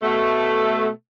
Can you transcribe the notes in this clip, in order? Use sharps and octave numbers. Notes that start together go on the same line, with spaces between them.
B2 A3